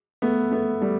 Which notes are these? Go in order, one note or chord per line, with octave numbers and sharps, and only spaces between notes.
A3 B3
A3 B3
G3 A3